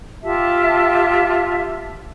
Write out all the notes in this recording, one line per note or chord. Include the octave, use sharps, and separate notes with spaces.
F4 G4 E5 A5